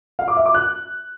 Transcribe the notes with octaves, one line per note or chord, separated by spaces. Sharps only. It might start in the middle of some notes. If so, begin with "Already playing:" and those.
F5
D6
E5
D6
F#6